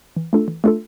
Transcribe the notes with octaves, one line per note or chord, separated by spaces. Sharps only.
E3
A3 D4 F4 A4
E3
A3 D4 F4 A4